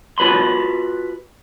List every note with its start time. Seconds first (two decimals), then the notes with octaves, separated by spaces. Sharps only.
0.18 F4 F#4 B4 B5 C6